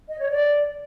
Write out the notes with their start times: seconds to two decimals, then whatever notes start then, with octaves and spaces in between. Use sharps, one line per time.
0.09 D#5
0.19 C#5
0.30 D5